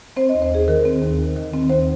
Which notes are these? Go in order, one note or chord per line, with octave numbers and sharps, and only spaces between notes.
C4 C5
D#5
D#2
C5
D#2 G#4
D#3 A#4
C4
D#2
D#2
D#3
C4
D#2 C5